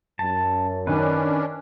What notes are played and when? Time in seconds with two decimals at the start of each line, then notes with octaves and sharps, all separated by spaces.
0.19 F#2 A5
0.87 D#3 C#4 D4 B4